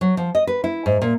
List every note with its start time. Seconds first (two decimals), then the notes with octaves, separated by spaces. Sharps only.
0.01 F#3
0.17 F3
0.35 D#5
0.47 B4
0.64 E4
0.86 G#2
1.02 A#2